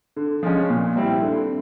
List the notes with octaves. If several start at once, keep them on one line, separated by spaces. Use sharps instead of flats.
D3
F3 G#3 C#4
A#2
G3 C4 E4
D3